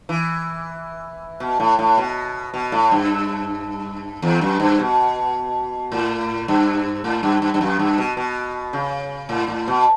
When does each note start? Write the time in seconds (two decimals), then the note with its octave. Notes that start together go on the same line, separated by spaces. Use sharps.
0.09 E3
1.40 B2
1.60 A2
1.79 A2
1.98 B2
2.54 B2
2.72 A2
2.91 G2
4.22 E2
4.41 F#2
4.60 G2
4.79 B2
5.92 A2
6.48 G2
7.04 A2
7.23 G2
7.42 G2
7.54 G2
7.61 F#2
7.79 G2
7.98 B2
8.17 B2
8.73 C#3
9.29 A2
9.48 A2
9.68 B2